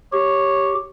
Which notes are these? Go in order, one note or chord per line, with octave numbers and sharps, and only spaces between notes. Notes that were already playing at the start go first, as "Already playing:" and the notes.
G4 C#5